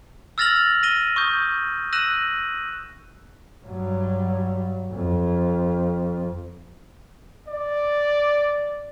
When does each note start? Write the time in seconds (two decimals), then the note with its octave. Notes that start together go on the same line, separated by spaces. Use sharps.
0.38 E6 F6 A6 A#6 F7 F#7
0.83 A#6 D#7 G7
1.16 C#6 D#6 G6
1.93 E6 F#6 A#6 D#7 E7 F#7
3.65 G2 F#3
4.92 F2
7.48 D5